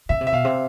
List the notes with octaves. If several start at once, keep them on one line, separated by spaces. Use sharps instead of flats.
C#3 E5
C3
E5
B2 F5
C3